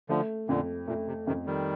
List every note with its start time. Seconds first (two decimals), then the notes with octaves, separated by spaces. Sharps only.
0.09 D3 F3 A3
0.48 F2 A#2 D3
0.88 A#2 A3
1.07 C3
1.27 F2 C3 D#3
1.46 D#3 G3